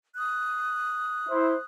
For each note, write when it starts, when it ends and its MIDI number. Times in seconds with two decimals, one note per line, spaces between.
0.16 1.64 87
0.16 1.64 90
1.29 1.54 64
1.29 1.54 72